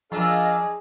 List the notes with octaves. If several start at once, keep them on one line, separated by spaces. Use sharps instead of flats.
F3 D4 F4 G#4 A#4 D#5 E6